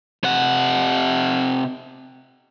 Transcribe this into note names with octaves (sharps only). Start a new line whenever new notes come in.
C3 F#5